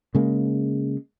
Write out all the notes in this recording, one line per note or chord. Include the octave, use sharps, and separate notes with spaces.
C#3 G#3 A#3